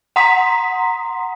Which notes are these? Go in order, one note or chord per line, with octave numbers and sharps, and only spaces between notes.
F#5 A#5 C6 D#6 B6